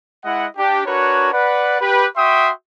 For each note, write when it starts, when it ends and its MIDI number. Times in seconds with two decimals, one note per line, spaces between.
0.25 0.46 56
0.25 0.46 64
0.25 0.46 75
0.25 0.46 78
0.57 0.82 62
0.57 0.82 67
0.86 1.32 62
0.86 1.32 66
0.86 1.32 70
0.86 1.32 71
0.86 1.32 73
1.32 1.79 71
1.32 1.79 74
1.32 1.79 78
1.80 2.07 67
1.80 2.07 71
2.17 2.51 66
2.17 2.51 76
2.17 2.51 79
2.17 2.51 84
2.17 2.51 85
2.17 2.51 87